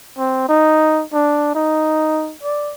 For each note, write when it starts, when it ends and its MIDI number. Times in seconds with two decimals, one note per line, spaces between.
0.18 0.48 60
0.49 1.03 63
1.13 1.50 62
1.55 2.34 63
2.43 2.75 74